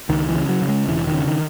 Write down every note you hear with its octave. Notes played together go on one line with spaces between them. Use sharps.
C#2 D#3
E3
C#3
F#3
C#3
G#3
E1 E3
D#3
C#3
D#3